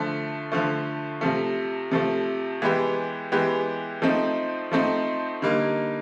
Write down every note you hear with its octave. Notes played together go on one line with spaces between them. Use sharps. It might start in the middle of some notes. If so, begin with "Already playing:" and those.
Already playing: D3 F3 A3
D3 F3 A3
C3 F3 A3
C3 F3 A3
E3 G#3 B3 E4 G4
E3 G#3 B3 E4 G4
F3 A3 C4 D#4
F3 A3 C4 D#4
D3 G3 A#3 D#4